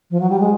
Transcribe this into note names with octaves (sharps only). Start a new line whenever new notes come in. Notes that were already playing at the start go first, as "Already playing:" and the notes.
F3
F#3
G3
G#3